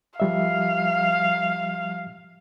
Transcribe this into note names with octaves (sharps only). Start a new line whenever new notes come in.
F3 G3 E5 F5